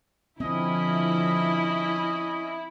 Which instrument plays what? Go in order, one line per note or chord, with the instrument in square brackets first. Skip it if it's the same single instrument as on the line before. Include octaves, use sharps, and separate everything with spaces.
[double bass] D3 F3 [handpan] C4 [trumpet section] C#4 D#5 [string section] E4